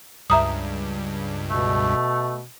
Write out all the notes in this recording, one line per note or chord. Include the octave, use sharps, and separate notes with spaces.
C#2 G2 E5 A#5 D#6
B2 A3